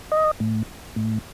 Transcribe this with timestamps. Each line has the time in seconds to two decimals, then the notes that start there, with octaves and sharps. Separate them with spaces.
0.12 D#5
0.40 A2
0.96 A2